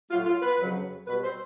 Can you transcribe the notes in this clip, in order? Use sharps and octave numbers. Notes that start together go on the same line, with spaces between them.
A2 F#3 A3 F4
F4
B4
F2 C#3 F#3
B2 G3 B4
C5